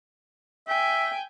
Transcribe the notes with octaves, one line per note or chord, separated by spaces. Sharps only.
E5 G5 G#5